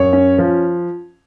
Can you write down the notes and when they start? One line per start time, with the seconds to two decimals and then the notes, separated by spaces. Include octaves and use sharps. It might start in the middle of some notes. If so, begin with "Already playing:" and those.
Already playing: F#2 C#5
0.13 C#4
0.38 F3